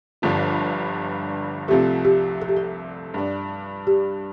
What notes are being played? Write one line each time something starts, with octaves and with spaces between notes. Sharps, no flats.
G1 G2 D3 F3 F4
C2 C3 F3 A3 G4
G4
A4
G4
A4
G2 G3 D4
G4